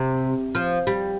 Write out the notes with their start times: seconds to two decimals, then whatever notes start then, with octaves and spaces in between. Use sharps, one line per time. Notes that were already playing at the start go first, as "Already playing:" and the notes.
Already playing: C3
0.55 F3
0.87 G3